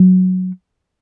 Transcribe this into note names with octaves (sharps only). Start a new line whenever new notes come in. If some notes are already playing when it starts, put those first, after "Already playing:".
Already playing: F#3